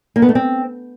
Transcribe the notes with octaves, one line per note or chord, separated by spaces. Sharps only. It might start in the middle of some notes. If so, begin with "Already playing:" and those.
A#3
B3
A3
C4